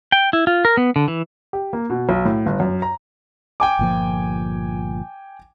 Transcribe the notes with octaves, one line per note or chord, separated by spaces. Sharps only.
G5
E4
F4
A#4
B3
D3
E3
G4
A#3
B2
B1
A2
G1
F#2
A#5
G5 G#5 D6
G1 A#2 F3